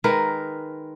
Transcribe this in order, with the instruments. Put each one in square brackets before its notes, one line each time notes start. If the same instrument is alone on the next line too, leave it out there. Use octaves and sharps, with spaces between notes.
[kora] D#3 G#3 A#4 B4